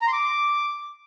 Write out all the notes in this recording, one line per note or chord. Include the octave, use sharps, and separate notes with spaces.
A#5
C6
D6